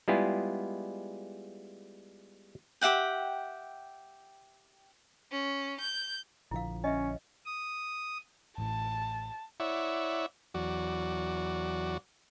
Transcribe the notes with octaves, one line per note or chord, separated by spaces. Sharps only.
G3 G#3 B3 E4 F4 G#4
G4 E5 F#5 G5
C#4
G6
A#1 D3 F3 E4 F5
C#4 D#5 E5
D#6
A1 A2 A5
E4 C#5 D5 E5 F#5
E2 F#3 F#4 D5